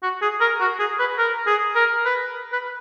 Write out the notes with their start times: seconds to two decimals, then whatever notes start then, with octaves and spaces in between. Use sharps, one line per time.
0.03 F#4
0.22 G#4
0.41 A#4
0.60 F#4
0.79 G#4
0.99 B4
1.18 A#4
1.47 G#4
1.75 A#4
2.05 B4
2.52 B4